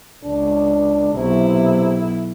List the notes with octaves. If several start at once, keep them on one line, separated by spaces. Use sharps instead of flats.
C#2 D4
B1 C3 E4